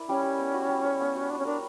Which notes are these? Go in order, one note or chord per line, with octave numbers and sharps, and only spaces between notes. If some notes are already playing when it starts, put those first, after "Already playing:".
Already playing: E4 A#4 D5
G3 C#4
G3
B3
F#4
G3
C#5
B3
F#4
G3 D4
C#4
D4 A#4